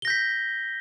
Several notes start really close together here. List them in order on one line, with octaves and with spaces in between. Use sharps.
G7 A#6 G6 B6